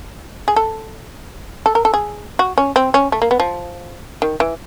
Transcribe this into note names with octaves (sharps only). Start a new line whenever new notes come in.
G#4
A4
A4
A#4
A4
G#4
F#4
C#4
C4
C#4
A3
A#3
B3
F3
D#3
E3